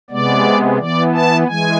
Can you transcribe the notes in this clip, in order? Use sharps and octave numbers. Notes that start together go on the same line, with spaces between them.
C3 G#3 B3 D5
E3 B3 D5
A5
E3 G#3 G#5